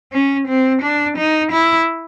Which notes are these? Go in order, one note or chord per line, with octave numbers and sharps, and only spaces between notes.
C#4
C4
D4
D#4
E4